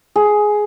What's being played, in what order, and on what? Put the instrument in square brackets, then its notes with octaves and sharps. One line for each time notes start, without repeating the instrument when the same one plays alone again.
[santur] G#4